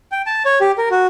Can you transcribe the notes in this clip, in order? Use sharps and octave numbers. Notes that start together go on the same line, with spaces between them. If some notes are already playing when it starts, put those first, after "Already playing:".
G5
A5
C#5
G4
A#4
F#4